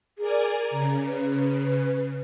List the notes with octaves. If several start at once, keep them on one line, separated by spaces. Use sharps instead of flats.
G#4 A#4 D5 G#5
C#3 A#5
B4